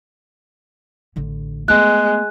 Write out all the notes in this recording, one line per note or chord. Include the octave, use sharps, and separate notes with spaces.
A1 D3
G#3 A3 B3 F#6